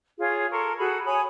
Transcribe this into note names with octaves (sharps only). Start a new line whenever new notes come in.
F4 G#4 C#5
A4 A#4 C6 C#6
F#4 G#4 A4 B5
C#5 G#5 B5 D#6